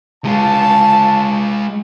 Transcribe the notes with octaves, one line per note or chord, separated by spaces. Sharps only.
G#3 F4 A5